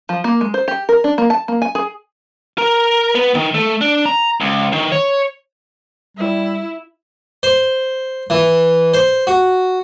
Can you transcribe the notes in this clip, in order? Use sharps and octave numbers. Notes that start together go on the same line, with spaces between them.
F3
A#3
G#3
C5
G4
A#4
D4
A#3
A5
A#3
G#5
G#4
A#4
B3
D#3
A3
D4
A#5
C#2
D#3
C#5
G3 E4
C5
E3
C5
F#4